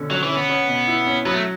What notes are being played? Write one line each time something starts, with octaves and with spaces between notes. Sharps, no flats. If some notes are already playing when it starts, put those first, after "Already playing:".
Already playing: B2 D3 C#4
F#3 C#4
E3
C#4
B3
C#4
B2
E4
C#4
F#3 B3
A3